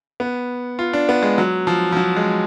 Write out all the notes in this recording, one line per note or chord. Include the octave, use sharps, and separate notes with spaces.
B3
F4
D4
B3
G#3
F#3
F3
F3
F#3
G#3